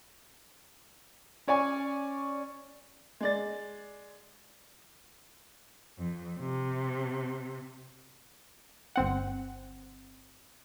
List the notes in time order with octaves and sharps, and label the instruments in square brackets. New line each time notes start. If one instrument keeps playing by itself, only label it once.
[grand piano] C#4 C#5 D5 G#5 C#6
[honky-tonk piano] G#3 D5 A6
[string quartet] F2
C3
[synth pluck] G1 C4 F#5